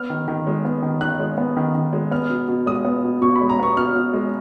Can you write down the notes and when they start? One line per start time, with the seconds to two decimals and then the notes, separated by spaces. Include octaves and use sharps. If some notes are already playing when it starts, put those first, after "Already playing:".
Already playing: B3 F6
0.10 D#3
0.28 D#3
0.47 G#3
0.65 B3
0.82 D#3
1.01 D#3 F#6
1.20 G#3
1.38 B3
1.57 D#3
1.74 D#3
1.93 G#3
2.11 B3 F6
2.30 B2
2.48 B2
2.66 G#3 D#6
2.85 B3
3.04 B2
3.21 B2 C#6
3.36 B5
3.41 G#3
3.49 A#5
3.59 B3 C#6
3.77 B2 F6
3.95 B2
4.13 G#3